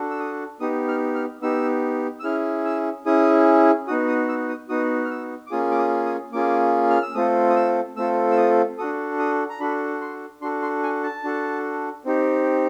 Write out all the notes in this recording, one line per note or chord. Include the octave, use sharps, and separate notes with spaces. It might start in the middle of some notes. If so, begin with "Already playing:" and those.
Already playing: D4 F#4 A4
E6
D#6
B3 D#4 G4 D#6
F6
F6
B3 D#4 G4 E6
E6
C#4 E4 G#4 F6
E6
C#4 E4 G#4 D#6
B3 D#4 F#4 D#6
D#6
E6
D#6
B3 D#4 F#4 D#6
F6
E6
D6
A#3 C#4 F4 G#4 D#6
D6
D#6
D#6
A#3 C#4 F4 G#4 D6
F6
E6
A3 C4 F4 A4 D#6
D#6
E6
A3 C4 F4 A4 E6
E6
D#6
D4 F#4 A4 D#6
D#6
A#5
D4 F#4 A4 B5
C6
D4 F#4 A4 C6
C6
G#5
A5
D4 F#4 A4
C4 D#4 G4